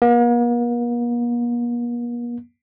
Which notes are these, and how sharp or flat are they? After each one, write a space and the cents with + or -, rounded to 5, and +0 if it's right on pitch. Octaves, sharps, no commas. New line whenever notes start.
A#3 +45